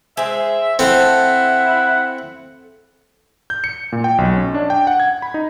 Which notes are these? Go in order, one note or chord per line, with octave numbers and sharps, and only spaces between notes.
G#3 C4 E5
C4 E4 A4 F5 F#5 A5
G6
C#7
A#2
G5
B1
C#4
D4
G5
F#5
G#6
B5
D#4